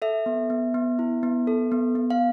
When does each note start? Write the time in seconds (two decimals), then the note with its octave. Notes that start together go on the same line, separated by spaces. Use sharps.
0.02 A4 E5
0.26 B3
0.50 B3
0.74 B3
0.99 E4
1.23 B3
1.47 A4
1.72 B3
1.95 B3
2.10 F5